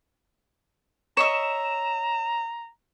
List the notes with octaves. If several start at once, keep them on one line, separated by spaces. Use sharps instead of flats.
C#5 D#5 E5 A#5 E7